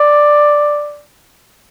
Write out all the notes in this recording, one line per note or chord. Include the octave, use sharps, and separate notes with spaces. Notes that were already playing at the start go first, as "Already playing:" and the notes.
Already playing: D5